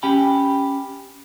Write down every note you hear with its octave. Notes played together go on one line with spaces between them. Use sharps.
C#4 G4 G5 B5